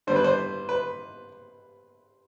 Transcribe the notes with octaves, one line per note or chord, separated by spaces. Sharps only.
D3 G3 B3 C5
B4
C5
B4